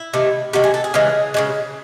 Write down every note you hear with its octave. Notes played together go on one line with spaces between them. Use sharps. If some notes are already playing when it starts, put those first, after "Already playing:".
Already playing: E4
C3 D#3 A3
C3 D#3 A3 F#4
G#4
A4
G#4
C#3 E3 G#3
C#3 E3 G#3